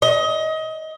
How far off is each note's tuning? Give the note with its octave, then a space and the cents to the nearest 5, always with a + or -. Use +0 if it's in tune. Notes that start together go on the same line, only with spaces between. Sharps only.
D#5 +25